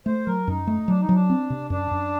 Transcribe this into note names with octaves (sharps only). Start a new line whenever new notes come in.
A3 C5
F#3 A#4
F#2 D#4
A3
F#3 D4
D#4
F#3
D4
C4
C3
F#2 D4
F#2